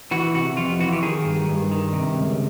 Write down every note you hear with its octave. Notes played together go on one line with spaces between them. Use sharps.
E3 F#4
C3 F#4
F2 F4
E3 F#4
G4
D#3 G#4
G2
G2
D#3
C3
C#2